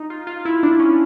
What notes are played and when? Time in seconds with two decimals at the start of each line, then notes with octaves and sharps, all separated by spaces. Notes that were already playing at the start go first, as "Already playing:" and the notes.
Already playing: D#4
0.10 F4
0.27 F4
0.45 E4
0.63 D4
0.80 C#4